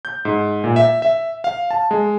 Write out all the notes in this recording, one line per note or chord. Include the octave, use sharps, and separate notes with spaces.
G6
G#2
A#2
E5
E5
F5
A5
G#3